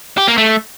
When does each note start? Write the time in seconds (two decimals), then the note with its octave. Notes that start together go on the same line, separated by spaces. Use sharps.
0.18 G4
0.28 A#3
0.38 A3